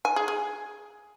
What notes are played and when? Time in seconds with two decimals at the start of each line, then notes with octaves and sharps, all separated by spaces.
0.05 G#5
0.16 G#4
0.28 G#4